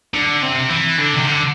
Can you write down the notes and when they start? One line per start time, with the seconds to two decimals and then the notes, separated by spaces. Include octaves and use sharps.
0.14 D3
0.43 C3
0.71 E3
0.99 D3
1.15 C3
1.27 D3